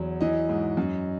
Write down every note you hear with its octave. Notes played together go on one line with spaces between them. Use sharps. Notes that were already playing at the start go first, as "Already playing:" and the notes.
Already playing: E2 F#3
E3 D#5
G#2
F#2